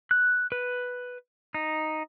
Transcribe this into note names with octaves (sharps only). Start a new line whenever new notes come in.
F#6
B4
D#4